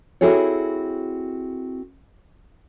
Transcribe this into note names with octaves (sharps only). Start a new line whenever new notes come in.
C4 E4 F#4 G#4 A4 C#5